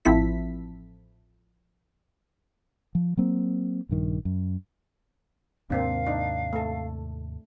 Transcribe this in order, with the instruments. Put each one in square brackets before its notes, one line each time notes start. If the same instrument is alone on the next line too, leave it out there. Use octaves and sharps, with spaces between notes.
[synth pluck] A1 F3 C4 E4 A4 B6
[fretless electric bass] F3
F#3 A#3 C4
A#1 G2 D#3
F#2
[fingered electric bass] D#2 G#2 C3 [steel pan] A#3 C4 D4 [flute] F5
[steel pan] D4 D#4
A3 A4